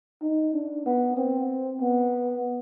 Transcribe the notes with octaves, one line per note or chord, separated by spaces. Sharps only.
D#4
D4
B3
C4
B3